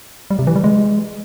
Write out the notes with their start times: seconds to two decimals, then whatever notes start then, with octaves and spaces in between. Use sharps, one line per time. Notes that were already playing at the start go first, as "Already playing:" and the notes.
0.30 G3
0.39 C3
0.47 E3
0.56 G3
0.64 G#3